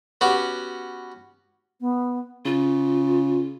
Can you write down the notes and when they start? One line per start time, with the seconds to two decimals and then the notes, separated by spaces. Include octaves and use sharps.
0.21 B3 C#4 F#4 G4
1.81 B3
2.45 C#3 F4